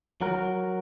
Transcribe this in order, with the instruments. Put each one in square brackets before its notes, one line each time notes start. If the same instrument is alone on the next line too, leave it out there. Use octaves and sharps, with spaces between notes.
[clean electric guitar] F#3 F#4 A#4